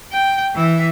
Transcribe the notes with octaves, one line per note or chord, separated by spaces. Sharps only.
G5
E3 E5